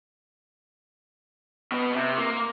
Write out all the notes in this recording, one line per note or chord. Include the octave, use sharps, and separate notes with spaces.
B2 B3
C3
A#3